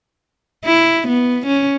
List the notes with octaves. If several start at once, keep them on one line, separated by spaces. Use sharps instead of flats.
E4
B3
C#4